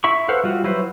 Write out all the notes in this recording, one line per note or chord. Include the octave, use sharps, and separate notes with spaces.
E4 E5 B5 C#6
A4 B4 C5 F5 F#5
G3 F4 F#4
F#3 E4 B4 C5